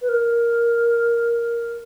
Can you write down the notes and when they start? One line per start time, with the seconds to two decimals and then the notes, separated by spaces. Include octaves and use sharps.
0.01 B4
0.08 A#4